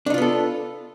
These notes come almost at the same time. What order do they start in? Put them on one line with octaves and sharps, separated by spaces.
D4 D#4 F4 B3 A4